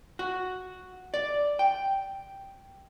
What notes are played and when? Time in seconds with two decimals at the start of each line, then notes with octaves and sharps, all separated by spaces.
0.19 F#4
1.14 D5
1.59 G5